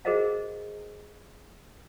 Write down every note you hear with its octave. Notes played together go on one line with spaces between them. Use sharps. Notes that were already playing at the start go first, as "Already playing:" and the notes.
F#4 G#4 A#4 C5 D#5 F5